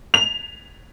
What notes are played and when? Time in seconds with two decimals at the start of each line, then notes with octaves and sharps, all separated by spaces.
0.14 F7